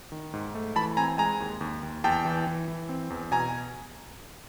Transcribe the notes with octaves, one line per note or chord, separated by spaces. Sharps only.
D#3
G#2
A3
E3 A5 B5
C4 G#5 A#5
G#3 G#5 A#5
D#2
D#2
D#2
E2 G5 A5
E3
E3
E3
C4
E2
B2 G#5 A#5